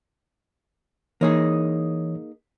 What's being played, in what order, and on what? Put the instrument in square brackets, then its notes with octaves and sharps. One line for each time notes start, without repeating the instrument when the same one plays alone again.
[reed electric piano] E3 C#5 D#6 [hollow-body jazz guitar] A#3 D#4 G#4